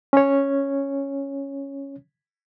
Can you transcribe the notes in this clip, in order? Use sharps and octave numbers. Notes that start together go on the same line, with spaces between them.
C#4 C#5